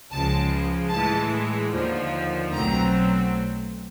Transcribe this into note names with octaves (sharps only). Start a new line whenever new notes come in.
C#2 C#3 F3 G#3 A5
A2 E3 G#3 A5
D#2 D3 F3
B1 B2 F#3 A3 C4 A#5